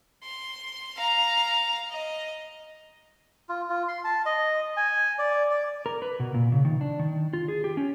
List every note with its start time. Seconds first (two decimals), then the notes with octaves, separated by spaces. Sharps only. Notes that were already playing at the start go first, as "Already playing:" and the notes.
0.23 C6
0.96 F5 A#5
1.91 D#5
3.49 F4
3.69 F4
3.88 C6
4.04 A5
4.26 D#5
4.77 G#5
5.19 D5
5.51 D5
5.86 A#4
6.02 B4
6.20 B2
6.34 A#2
6.52 C#3
6.65 D#3
6.81 D4
6.99 D#3
7.33 F4
7.48 G#4
7.64 G4
7.77 C#4